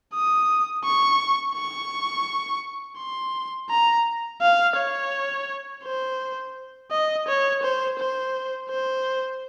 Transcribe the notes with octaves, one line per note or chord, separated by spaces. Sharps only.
D#6
C#6
C#6
C6
A#5
F5
C#5
C5
D#5
C#5
C5
C5
C5